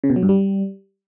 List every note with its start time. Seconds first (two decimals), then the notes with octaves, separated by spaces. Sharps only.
0.04 C#3
0.10 B2
0.16 F#3
0.23 G2
0.29 G3